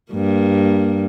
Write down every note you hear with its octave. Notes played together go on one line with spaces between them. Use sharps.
G2 A#3